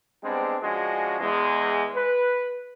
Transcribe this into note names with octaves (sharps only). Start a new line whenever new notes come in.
G3 G#3 B3 C4 D4
F3 G#3 C#4 D4 F#4
E2 G#3
B4